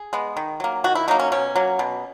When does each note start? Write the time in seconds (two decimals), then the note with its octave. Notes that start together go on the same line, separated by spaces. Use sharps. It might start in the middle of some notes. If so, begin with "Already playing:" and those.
Already playing: G#4
0.13 G#3 B3
0.37 D#3
0.60 F#3 A#3
0.84 D#3 F#4
0.95 E4
1.08 F#3 A#3 D#4
1.19 C#4
1.32 B2 C#4
1.56 F#3 A#3
1.79 B2